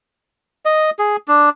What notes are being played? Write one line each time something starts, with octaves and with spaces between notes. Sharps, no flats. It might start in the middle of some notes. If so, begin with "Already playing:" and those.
D#5
G#4
D4